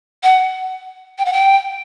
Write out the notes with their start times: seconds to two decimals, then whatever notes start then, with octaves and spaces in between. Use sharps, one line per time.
0.23 F#5
1.18 G5
1.25 F#5
1.33 G5